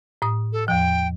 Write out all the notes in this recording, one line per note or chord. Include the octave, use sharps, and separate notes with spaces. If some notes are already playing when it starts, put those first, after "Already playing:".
A2 D#6
A4
E2 F3 G5